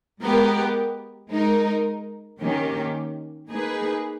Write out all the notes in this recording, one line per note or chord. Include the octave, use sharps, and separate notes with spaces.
G#3 B3 G4 A#4
G#3 D#4 A#4
D#3 A#3 C#4 G4
A#3 D#4 G#4 B4